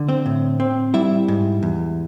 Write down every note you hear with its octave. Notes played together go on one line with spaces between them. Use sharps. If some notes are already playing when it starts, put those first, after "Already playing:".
Already playing: D3
C4 C5
A2
C4
G3 E4 E5
G#2
E2